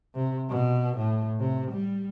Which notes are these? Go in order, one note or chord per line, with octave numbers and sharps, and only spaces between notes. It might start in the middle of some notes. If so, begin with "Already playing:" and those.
C3
B2
A2
C3
G3